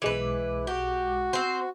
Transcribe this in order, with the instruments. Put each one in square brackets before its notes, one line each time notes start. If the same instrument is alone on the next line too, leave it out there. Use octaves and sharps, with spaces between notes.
[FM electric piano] B1 G#3 D6 [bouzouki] E3 B4 [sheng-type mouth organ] E4
[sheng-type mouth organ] F#4 [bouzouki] G4
[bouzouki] C4 C5